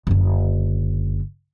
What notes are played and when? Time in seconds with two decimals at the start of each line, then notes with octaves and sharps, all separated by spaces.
0.07 F#1 D3